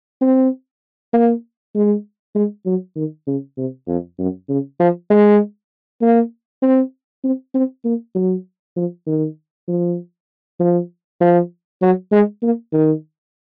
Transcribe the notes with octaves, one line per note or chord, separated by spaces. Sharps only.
C4
A#3
G#3
G#3
F#3
D#3
C#3
C3
F2
F#2
C#3
F3
G#3
A#3
C4
C4
C4
A#3
F#3
F3
D#3
F3
F3
F3
F#3
G#3
A#3
D#3